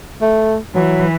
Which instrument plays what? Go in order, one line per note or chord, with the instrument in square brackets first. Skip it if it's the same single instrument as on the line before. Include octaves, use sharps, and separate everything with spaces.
[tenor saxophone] A3
[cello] E3 [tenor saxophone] F#3